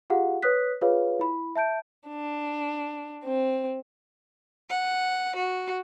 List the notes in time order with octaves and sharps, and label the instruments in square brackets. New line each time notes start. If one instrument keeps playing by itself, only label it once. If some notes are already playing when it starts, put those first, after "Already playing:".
[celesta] F4 G4 G#4 F5 F#5
B4 C#5 D#6 F#6 B6
F4 G#4 B4 C#5 F5
E4 B5
E5 A5 G6 D7
[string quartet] D4
C4
F#5
F#4